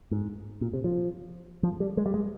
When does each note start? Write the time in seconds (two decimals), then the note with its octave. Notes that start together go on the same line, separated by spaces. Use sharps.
0.11 G#2
0.61 A#2
0.74 C3
0.84 F3
1.63 F3
1.80 G3
1.97 G#3
2.06 G3
2.14 G#3